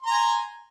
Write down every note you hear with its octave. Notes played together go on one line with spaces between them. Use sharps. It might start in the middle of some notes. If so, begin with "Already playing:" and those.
G#5 A#5 C6